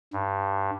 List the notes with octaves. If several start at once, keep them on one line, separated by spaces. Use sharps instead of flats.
G2